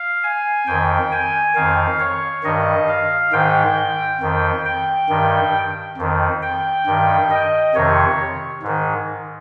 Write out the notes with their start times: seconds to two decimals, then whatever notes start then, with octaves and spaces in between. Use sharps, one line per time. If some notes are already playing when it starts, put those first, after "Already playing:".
Already playing: F5
0.23 G#5
0.67 F2 D#3 G5
1.12 G#5
1.55 F2 D#3 F5
2.00 C#5
2.43 G2 D#3 D#5
2.88 F5
3.32 G#2 D#3 G5
4.21 F2 D#3
4.65 G5
5.09 G2 D#3
5.97 F2 D#3
6.42 G5
6.86 G2 D#3
7.30 D#5
7.75 F2 C3 D#3 C#5
8.63 G#2 D#3